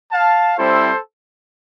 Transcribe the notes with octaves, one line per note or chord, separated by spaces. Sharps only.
F5 A5
G3 C4 E4 A4 C5